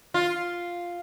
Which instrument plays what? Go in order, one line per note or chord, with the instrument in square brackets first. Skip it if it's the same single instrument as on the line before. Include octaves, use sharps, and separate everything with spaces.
[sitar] F4